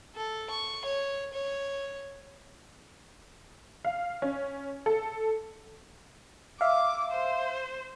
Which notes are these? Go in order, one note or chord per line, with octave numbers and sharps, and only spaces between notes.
A4
C#6
C#5
C#5
F5
C#4
A4
E5 F5 D6
C5